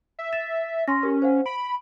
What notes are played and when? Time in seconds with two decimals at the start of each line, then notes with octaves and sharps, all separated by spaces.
0.19 E5
0.33 A6 E7
0.88 C#4 C6 A#6
1.03 G4 A#4
1.22 C5 F5 F#5
1.46 B5 D7